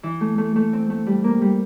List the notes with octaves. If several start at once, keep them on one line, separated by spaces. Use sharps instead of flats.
E3
A3
A3
A3
C4
A3
G3
A#3
G3